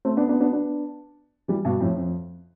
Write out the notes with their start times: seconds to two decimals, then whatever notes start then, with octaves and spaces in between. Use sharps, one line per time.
0.05 A3 C4
0.17 B3 D4
0.29 B3 D4
0.40 B3 D4
0.52 B3 D4
1.48 E3 G3
1.65 G2 B2
1.81 F2 A2
1.97 F2